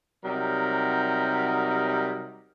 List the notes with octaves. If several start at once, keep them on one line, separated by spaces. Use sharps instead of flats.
C3 F#3 G3 D#4 A#4